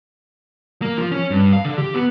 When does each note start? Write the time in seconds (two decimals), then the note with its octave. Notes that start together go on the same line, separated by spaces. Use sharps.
0.82 A#3
0.97 F3
1.11 C#4
1.30 G2
1.53 F5
1.65 D3
1.78 G4
1.94 B3